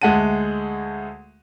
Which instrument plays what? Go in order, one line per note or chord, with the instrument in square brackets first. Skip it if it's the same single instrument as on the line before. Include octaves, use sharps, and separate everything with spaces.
[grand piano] D2 G#3 E5 F#5 A5 D#7